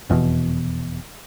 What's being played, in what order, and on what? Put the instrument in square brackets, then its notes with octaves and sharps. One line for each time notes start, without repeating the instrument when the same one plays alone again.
[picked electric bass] F1 E2 G#2 B2